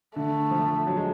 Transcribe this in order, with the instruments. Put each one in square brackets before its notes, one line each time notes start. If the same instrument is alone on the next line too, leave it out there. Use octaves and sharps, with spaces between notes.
[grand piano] D3 [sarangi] A3
[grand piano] F3
F#3
G#3